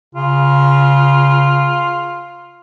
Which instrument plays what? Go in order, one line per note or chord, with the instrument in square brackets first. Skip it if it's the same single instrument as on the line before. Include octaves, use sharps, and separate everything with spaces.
[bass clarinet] C#3 [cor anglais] F4